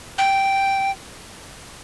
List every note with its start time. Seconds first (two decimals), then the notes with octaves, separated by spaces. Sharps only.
0.18 G5